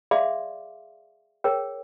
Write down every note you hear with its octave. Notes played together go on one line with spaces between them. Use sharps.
G#4 D5 E5 F5 C6 D6
G#4 A#4 C#5 G5